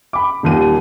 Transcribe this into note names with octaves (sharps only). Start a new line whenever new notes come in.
B5 D6
D#1 D#2 D#7